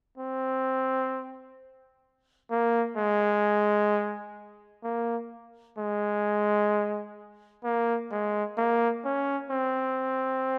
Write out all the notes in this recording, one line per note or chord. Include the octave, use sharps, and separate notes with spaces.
C4
A#3
G#3
A#3
G#3
A#3
G#3
A#3
C#4
C4